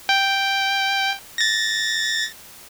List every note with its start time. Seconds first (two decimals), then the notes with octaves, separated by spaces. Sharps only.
0.09 G5
1.38 A6 A#6